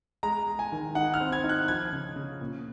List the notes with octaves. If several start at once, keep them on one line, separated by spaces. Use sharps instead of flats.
G#3 A#5
G#3
G#5
D#3
D#4 F#5
F6
C4
G#6
D#4
F#6
F3 G#6
C#3
C#3
A#2